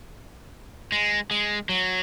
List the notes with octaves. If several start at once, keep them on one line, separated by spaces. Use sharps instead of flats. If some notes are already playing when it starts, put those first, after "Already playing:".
G#3
G#3
F#3